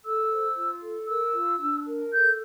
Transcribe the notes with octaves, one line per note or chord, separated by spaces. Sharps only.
A4 E6
C5
F4
A4
A#4 E6
F4
D4
A#4
A4 G6